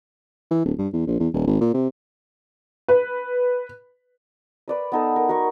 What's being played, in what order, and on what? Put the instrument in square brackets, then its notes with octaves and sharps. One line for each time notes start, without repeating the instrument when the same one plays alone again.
[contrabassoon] E3
D1
G2
E2
A#1
E2
D#1
G#1
A#2
C3
[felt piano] B4
[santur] B4 D5 D#6
B3 D#4 A4
A#4
F#4 A#4 C6 C#6